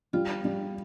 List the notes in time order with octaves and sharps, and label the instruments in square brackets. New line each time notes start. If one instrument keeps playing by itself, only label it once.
[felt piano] G3 [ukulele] F4
[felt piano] G3